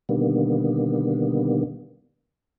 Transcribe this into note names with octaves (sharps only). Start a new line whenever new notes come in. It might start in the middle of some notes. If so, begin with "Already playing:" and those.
B2 D3 D#3 G3 A#3 B3